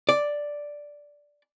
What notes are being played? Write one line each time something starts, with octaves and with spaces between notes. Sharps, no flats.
D5